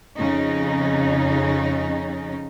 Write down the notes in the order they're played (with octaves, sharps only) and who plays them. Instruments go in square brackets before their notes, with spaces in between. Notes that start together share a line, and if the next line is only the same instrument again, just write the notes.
[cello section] F2 C#3 C#4 D#4